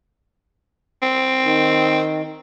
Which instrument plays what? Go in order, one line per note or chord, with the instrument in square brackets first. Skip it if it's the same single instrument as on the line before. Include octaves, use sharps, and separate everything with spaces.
[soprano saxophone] C4
[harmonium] D#3